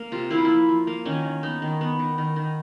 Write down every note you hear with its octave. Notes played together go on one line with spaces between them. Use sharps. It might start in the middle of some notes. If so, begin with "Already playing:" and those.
Already playing: A#3
C3 F4
A#3 E4
F4
F3 E4
F3
A#3
D#3 C#4
D#3
B3 D#4
D#3
B3
D#3
D#3
D#3